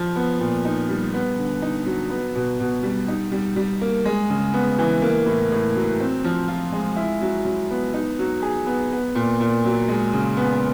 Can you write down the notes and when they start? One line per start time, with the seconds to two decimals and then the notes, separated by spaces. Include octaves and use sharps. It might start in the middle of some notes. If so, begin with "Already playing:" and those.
Already playing: F3
0.16 B3
0.40 A#2
0.65 D#4
0.89 G3
1.14 B3
1.38 D3
1.62 D#4
1.86 F#3
2.10 B3
2.35 B2
2.60 B2
2.83 G3
3.08 D#4
3.32 G3
3.56 G3
3.81 A#3
4.05 G#3
4.30 C#3
4.54 B3
4.78 E3
5.02 A#3
5.26 A2
5.52 A2
5.75 F#3
6.00 C4
6.24 F3
6.48 F4
6.72 G#3
6.96 E4
7.21 F#3
7.45 F#3
7.71 B3
7.94 D#4
8.19 F#3
8.42 G#4
8.67 B3
8.92 B3
9.15 A#2
9.40 A#2
9.65 F#3
9.88 G#3
10.13 C#3
10.37 B3